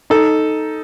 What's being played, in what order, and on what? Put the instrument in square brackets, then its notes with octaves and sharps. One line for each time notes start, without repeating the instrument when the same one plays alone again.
[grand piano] D#4 [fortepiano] A4